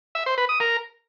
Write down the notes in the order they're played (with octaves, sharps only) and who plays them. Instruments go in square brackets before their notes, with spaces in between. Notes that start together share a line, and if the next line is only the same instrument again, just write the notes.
[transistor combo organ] E5
C5
B4
D#6
A#4